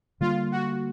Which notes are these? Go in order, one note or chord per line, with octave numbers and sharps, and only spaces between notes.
D3 G3 A#3 F4
F#4